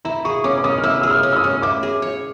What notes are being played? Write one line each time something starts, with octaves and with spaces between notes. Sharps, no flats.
E4 A#5
G#4 C#6
C#4 D6
D6
C#4 D#6
F6
E4 E6
G#4 E6
F6
C#4
E6
D#6
C#4
E4 D6
G#4
C#5